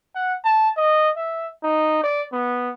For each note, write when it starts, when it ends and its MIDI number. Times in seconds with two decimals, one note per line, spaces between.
0.15 0.34 78
0.45 0.70 81
0.77 1.10 75
1.17 1.48 76
1.63 2.01 63
2.04 2.23 74
2.33 2.70 59